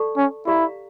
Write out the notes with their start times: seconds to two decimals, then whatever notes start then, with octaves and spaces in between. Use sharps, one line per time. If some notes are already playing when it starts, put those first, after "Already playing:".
Already playing: A4 D5 A5 C#6
0.17 C#4
0.47 E4 G4 D5 F5 A#5